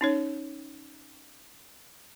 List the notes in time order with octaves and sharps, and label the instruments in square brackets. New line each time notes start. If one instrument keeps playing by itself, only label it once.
[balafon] C#4 D#4 C#5